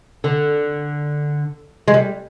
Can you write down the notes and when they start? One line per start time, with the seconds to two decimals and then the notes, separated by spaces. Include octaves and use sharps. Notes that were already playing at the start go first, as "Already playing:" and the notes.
0.24 D3
1.88 G#3
1.94 G3